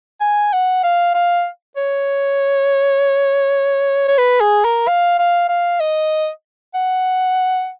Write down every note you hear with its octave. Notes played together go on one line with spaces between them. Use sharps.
G#5
F#5
F5
F5
C#5
C#5
B4
G#4
A#4
F5
F5
F5
D#5
F#5